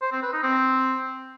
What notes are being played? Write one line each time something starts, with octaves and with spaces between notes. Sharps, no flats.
C5
C4
B4
D#4
C4